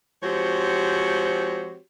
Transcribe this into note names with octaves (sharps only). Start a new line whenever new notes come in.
F3 G#3 C4 F#4 G4 C#5